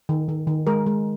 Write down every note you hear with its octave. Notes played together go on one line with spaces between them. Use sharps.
D#3
D#3
D#3
G#3 A#4
G#3